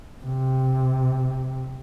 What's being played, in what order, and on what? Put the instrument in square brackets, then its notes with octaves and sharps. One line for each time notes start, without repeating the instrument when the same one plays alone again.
[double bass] C3